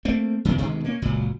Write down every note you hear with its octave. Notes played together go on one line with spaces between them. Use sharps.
A3 A#3 C4
F#2 C#3 E3 B3
D2 B2 D#3 G#3
A#3 C#4
F#1 C#2 A#2 F#3